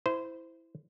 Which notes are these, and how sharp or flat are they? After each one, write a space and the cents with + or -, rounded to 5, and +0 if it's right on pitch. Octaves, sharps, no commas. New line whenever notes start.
E4 +0 C5 -20